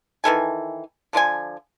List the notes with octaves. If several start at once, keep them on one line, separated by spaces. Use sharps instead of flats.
D#3 E3 A4 G#5
D3 F3 D5 G#5